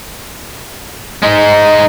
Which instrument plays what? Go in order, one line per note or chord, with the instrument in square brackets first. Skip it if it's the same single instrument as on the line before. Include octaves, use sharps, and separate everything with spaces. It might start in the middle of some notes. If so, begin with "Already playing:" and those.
[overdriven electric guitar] G#3 D#4